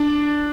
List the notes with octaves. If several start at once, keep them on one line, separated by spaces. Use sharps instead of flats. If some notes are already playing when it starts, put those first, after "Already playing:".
Already playing: D4